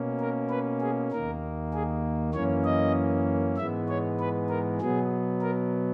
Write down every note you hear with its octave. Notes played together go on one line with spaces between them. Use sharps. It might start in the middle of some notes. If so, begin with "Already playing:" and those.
Already playing: B2 A#3 C#4
A#4
B4
G#4
D#2 D#3 A#3 A#4
G#4
F#2 E3 A#3 C#4 C#5
D#5
G#2 E3 G#3 B3 E5
C#5
B4
A#4
B2 F#3 B3 G#4
A#4